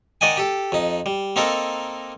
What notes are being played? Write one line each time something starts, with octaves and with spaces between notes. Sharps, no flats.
D#3 D5 D#5 F#5 G#5
G4 A4
F2 D#4
G3
A#3 C4 D#4 A4 A#4